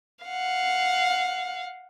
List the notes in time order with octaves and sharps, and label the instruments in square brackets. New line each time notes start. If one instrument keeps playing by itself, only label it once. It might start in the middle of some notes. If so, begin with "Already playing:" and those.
[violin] F5 F#5